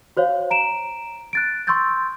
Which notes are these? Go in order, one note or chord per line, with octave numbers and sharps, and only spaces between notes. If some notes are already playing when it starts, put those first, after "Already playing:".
F#4 C5 C#5 F5
A#5 D7 E7
F#6 A6 D7
C6 C#6 E6 G6 A6